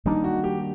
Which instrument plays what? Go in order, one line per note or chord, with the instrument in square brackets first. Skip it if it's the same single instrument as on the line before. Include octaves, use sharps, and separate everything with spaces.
[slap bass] D#3 G3 A#3 D4 [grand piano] D#4
[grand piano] F#4
G4